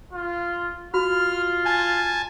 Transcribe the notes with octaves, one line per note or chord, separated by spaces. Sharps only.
F4
F4 F#4 F6
G#5 A5